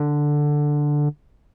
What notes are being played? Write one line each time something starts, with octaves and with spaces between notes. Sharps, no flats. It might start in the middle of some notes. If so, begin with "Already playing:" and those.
Already playing: D3